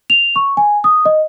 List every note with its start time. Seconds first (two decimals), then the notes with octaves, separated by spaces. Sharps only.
0.10 F7
0.36 C#6
0.57 G#5
0.84 D#6
1.06 D#5